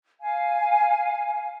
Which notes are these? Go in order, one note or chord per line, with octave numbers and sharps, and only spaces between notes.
F5 G#5